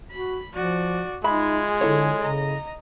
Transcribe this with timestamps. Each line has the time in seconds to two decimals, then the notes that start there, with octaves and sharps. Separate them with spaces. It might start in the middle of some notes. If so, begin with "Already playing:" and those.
0.12 F#4 B5
0.54 F3 F#4 D5
1.24 G#3 D#4 F4 G#4 E5 B5
1.81 D3 E4 A4 C#5
2.20 C#3 D#5 A#5